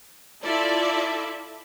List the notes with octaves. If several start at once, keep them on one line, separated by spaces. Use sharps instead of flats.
E4 F4 A4 D5 E5